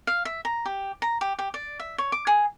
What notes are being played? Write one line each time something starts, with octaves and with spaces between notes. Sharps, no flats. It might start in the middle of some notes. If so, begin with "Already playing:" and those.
F5
E5
A#5
G4
A#5
G4
G4
D5
E5
C#5
D6
G#4